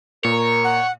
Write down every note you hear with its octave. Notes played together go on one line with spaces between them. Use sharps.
A#2 A#4 C#5
F#5